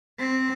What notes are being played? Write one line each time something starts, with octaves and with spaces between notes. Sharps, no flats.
C4